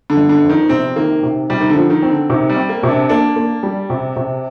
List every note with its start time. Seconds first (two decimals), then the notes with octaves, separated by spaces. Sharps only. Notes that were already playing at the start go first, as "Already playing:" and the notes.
0.10 D3
0.17 G1
0.29 D3
0.43 F2
0.49 D#3
0.69 C3 C4
0.96 D#3 A#3
1.23 C3
1.50 C3 G3
1.61 D#3
1.70 D3
1.76 F3
1.90 D#3
2.02 C4
2.10 D3
2.29 C3 D#3
2.49 G3
2.56 C4
2.69 A#3
2.83 C3
2.89 D4
3.09 A#3 D4
3.36 A#3
3.63 G3
3.90 C3
4.16 C3